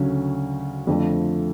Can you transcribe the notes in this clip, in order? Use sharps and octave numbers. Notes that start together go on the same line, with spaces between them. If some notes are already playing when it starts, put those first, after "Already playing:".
Already playing: D2 C#3 F#3 C#4
F2 D3 F3 A3